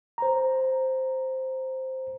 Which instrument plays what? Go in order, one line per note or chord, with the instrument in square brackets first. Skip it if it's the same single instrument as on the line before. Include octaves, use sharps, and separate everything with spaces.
[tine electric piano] C5 A#5